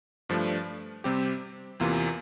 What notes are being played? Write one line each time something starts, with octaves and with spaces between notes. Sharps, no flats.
G2 F3 A3 D4
C3 G3 C4 G4
E2 C3 E3 A#3 F4